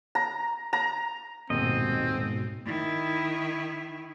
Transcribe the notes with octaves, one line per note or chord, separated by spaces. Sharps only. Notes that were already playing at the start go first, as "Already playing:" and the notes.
A#5
A#5
D#1 G#2 B2 C4 D#5
D#3 E4